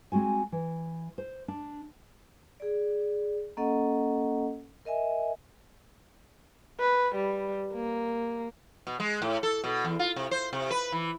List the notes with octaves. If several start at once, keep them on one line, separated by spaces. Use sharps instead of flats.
G#3 C4 F#4 G#5
E3
C5
D4
G#4 D5
A#3 C#4 A4 D#5 F#5
A#4 D#5 E5 G#5
B4
G3
A#3
B2
G#3
A2
A4
B2
E2
F4
C3
C5
C3
B4
E3